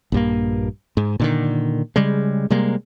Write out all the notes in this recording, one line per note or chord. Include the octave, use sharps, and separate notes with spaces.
A#1 G2 A#3
G#2
A#2 D3 D#3
C#3 G3 G#3
C3 G3 G#3 A#3